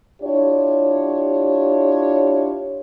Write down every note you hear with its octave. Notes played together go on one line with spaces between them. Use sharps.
D4 E4 F4 G4 C#5